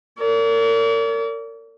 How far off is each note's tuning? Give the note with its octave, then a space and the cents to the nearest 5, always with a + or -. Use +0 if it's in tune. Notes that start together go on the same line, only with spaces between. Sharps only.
A#4 -35 D5 -45